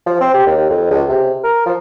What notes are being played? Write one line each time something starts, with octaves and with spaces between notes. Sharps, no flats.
F3
C4
G4
D#2
F2
C#2
C3
A#4
F3